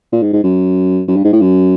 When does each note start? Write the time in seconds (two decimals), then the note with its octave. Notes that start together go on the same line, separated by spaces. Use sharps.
0.12 A#2
0.22 G#2
0.33 G#2
0.44 F#2
1.08 F#2
1.16 G2
1.24 G#2
1.32 A2
1.41 F#2